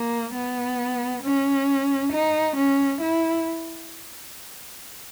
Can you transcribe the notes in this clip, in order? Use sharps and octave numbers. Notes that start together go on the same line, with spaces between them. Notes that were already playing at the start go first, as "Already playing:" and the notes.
Already playing: A#3
B3
C#4
D#4
C#4
E4